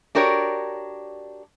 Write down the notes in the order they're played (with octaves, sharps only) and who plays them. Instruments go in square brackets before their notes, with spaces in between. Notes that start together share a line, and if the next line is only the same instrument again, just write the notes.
[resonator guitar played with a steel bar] D4 F#4 G4 A#4 C#5 D5